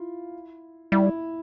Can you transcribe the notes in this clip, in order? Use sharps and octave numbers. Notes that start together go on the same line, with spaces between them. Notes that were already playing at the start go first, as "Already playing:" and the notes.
Already playing: E4 F4
G3 E4
E4